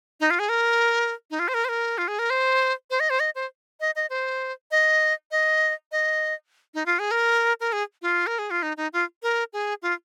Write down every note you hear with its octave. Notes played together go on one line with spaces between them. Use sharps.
D#4
F4
G#4
A#4
D#4
F4
C5
A#4
C5
A#4
F4
G#4
A#4
C5
C5
D#5
C5
D#5
C5
D#5
D#5
C5
D#5
D#5
D#5
D#4
F4
G#4
A#4
A#4
G#4
F4
A#4
G#4
F4
D#4
D#4
F4
A#4
G#4
F4